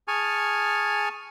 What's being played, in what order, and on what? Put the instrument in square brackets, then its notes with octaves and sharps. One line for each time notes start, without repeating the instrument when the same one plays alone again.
[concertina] G#4 G#5 A5 C#6 F6